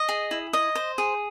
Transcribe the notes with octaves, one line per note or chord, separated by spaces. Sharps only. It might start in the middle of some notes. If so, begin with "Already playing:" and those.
Already playing: D#5
G#4
E4
D#5
C5
G#4